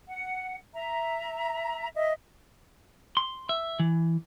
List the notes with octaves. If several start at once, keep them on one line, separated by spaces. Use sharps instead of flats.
F#5
E5 A#5
D#5 E5
C6
E5
E3